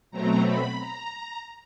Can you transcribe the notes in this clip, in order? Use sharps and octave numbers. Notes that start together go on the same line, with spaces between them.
B2 F#3 A3 C4 A#5
B5
A#5